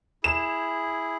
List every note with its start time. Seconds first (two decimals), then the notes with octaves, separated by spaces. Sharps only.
0.24 E4 G#4 E7